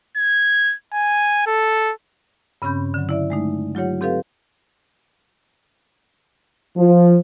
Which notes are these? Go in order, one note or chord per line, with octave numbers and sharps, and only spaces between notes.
G#6
G#5
A4
G2 C#3 C4 C#4 B5 G6
D3 F#3
E4 D5 E5
G#3 A3 D#4
F#3 F4 G4 C#5 F#5
C4 G4 A4 B4 F5
F3